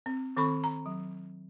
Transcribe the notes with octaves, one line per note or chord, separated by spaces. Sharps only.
C4
D#3 C4 A4 B5 C#6
A#5
F#3